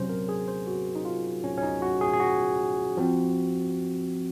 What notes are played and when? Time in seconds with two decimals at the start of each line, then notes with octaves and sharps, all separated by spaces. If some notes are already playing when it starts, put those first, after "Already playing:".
Already playing: C3 F#3 C#4 C5
0.09 A#4
0.29 G#4
0.48 C5
0.67 F#4
0.95 D#4
1.05 F4
1.44 C#4
1.58 C#4
1.63 D#4
1.82 F#4
2.01 G#4
2.13 G#4
2.20 F#4
2.97 F3 C4